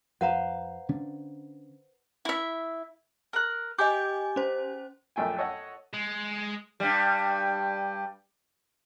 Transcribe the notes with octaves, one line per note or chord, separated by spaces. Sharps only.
F2 B4 C5 F5 F#5 A#5
D3 C#4 D4
E4 E5
A#4 F#6
G4 D#5 G#5 D6
C#4 C5
A#1 F#2 A3 G5 G#5
A4 C#5 D#5 F#5
G#3
G2 G3